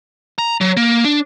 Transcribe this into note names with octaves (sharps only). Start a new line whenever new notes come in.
A#5
F#3
A#3
D4